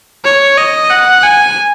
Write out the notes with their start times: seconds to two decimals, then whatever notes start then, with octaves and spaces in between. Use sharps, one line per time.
0.24 C#5
0.57 D#5
0.90 F#5
1.23 G#5